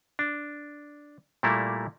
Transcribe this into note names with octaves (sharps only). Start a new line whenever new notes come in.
D4
A#2 G3 A3 A#3 E4